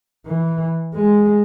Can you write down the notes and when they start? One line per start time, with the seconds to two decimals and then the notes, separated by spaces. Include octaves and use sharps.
0.26 E3
0.95 G#3